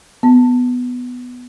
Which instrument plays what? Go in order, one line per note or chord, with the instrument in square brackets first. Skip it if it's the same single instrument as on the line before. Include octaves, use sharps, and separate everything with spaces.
[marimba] B3